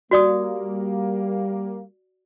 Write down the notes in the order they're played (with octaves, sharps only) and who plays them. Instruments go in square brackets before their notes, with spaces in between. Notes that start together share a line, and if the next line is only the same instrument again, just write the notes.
[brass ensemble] G3 A#3 [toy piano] F#4 D5 D#6